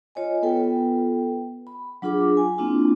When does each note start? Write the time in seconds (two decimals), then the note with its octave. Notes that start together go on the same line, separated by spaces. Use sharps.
0.15 F4 C#5 D#5 G#5
0.42 B3 F4 A4 B4 G5
1.67 B5
2.02 F#3 D4 F4 G#4 D6
2.37 G#5
2.58 A#3 C4 D4 E4 F4